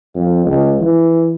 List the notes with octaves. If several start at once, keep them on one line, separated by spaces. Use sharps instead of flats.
F2
C#2
E3